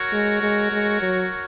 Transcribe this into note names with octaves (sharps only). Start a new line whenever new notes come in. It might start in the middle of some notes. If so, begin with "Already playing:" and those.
Already playing: F#4 A#4 C#5
G#3
G#3
G#3
F#3